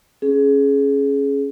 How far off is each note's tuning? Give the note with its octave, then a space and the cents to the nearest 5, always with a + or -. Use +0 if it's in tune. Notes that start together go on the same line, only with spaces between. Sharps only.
C#4 -10 G#4 +20